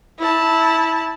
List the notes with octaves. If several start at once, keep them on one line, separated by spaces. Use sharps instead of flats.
E4 A5